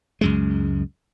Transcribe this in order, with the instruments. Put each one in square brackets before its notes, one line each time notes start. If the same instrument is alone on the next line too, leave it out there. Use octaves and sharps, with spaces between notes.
[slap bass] C#2 F#2 G#3